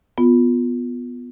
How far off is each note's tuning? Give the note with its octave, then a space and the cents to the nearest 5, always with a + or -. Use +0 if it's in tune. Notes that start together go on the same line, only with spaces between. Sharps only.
B3 +0 F4 +10